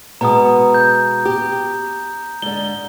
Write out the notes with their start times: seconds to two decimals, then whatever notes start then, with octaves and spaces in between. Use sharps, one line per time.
0.21 B2 G#3 B3 A#5 D#6
0.74 G6
1.25 G4
2.42 G#2 D3 G7